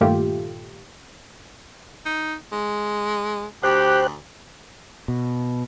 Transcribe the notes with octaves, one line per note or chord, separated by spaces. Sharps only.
G2 A#2 D#3 A3 F4 G4
D#4
G#3
D2 G4 C5 G5 F#6
B2